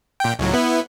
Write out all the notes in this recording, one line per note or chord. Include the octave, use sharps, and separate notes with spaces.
A#2 G5
C#2 A2 F#3
B3 E4